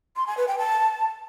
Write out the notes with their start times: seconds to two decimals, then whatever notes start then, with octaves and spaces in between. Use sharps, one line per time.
0.16 C6
0.27 G#5
0.37 B4
0.48 G5
0.58 A5